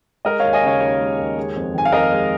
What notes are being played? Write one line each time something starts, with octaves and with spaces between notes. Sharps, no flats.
G#3 A#4 D#5
D#2 C#5 F5
D#5 G#5
C#3 C#5 F5
D#2 C#5
G#3
D#2
G#3
F2
D#3 G#5
F5
F2 A#4 D#5
G#3